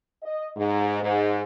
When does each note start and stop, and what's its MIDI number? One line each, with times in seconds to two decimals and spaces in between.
0.23 0.47 75
0.57 1.00 44
1.03 1.42 44